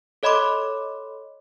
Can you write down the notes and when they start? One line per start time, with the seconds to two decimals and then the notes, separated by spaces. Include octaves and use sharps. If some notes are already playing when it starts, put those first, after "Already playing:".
0.23 A4 C#5 D#5 B5 C6 D6